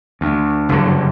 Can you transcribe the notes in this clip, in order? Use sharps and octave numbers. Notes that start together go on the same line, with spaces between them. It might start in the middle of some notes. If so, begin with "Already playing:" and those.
D2
F#1 G2 D3 F#3